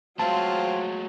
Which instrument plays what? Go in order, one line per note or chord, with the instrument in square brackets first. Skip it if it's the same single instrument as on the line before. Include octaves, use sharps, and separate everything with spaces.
[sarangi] F#3 [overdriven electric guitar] G#3 A3 [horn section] C4 F4 [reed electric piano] A5